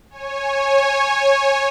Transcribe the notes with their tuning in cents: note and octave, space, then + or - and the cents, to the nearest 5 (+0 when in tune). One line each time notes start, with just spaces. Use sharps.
C#5 -15 G#5 +0